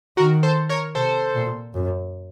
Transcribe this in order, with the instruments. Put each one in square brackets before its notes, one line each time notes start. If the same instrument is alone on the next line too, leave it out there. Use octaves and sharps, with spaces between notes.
[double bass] D#3 [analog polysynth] F#4 A#4
[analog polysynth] A4 C5
A#4 C#5
[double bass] C3 [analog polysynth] A4 C5
[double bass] A#2
F#2